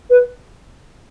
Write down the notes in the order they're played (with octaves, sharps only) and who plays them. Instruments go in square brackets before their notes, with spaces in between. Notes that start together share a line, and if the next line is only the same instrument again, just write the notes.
[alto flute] B4